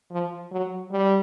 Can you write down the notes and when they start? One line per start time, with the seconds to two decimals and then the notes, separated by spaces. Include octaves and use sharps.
0.11 F3
0.51 F#3
0.92 G3